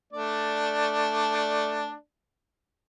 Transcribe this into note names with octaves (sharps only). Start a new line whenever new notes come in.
A3 D4 D5